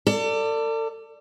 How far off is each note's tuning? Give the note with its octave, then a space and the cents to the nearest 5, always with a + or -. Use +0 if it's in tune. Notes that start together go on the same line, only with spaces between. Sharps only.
A4 +40 D5 +0